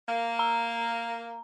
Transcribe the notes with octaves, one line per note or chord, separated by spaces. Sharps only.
A#3
A#5